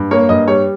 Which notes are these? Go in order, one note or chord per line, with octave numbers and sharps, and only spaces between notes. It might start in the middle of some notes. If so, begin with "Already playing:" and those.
Already playing: G2
A#3 C#5
G2 D#5
G3 C#5